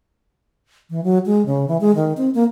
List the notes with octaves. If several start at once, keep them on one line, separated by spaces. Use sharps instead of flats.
E3
F#3
G#3
C#3
E3
G#3
D#3
C4
A#3